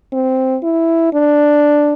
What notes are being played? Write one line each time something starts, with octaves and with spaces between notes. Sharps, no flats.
C4
E4
D4